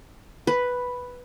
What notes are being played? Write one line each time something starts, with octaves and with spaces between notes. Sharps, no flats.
B4